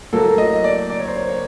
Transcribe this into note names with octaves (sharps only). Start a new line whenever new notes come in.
A2 F#3 A#3 A4
D#5
D5
D5
C#5
C5
C#5
C#5